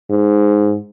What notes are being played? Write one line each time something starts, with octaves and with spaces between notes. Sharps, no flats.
G#2